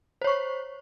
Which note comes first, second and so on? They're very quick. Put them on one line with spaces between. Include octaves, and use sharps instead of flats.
C5 C#5 C#6